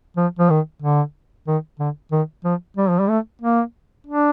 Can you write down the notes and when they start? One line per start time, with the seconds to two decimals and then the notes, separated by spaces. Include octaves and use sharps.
0.17 F3
0.39 F3
0.50 D#3
0.82 D3
1.47 D#3
1.79 D3
2.12 D#3
2.44 F3
2.77 G3
2.89 F3
2.99 G3
3.09 A3
3.41 A#3
4.07 D4